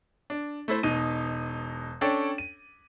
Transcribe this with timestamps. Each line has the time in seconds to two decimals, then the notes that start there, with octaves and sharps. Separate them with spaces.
0.30 D4
0.68 A3 E4 C5
0.83 E1 B2 D#4 D#7
2.01 C#4 D4 A4 C#5 G5
2.38 D#7